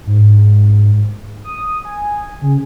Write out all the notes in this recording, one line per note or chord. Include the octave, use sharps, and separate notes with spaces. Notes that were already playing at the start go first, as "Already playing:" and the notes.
G#2
D#6
G#5
C#3